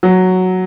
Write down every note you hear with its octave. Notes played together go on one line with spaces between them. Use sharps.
F#3